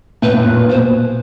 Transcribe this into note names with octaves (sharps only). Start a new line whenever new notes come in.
A2 B4
A2
A#2
A#2
B2 C5